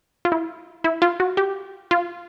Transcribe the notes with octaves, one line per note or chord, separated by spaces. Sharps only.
F4
E4
E4
F4
F#4
G4
F4